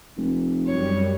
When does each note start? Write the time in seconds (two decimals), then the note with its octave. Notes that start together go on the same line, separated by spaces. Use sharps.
0.17 F1
0.67 F#2 G3 C#5